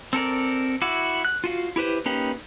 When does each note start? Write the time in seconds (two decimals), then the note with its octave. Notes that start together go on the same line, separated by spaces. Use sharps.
0.13 C4 A4 A#4 D5
0.82 E4 F#4 D6
1.25 F#6
1.44 F4 F#4 F5
1.76 E4 G4 B4 C5
2.06 A#3 C#4 D#4 G4 B4